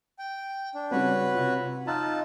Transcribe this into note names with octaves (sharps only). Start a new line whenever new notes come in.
G5
D4
C#3 G3 C4 F#4 B4 C#5
C3 F4
D#4 F4 A5 A#5 E6 F#6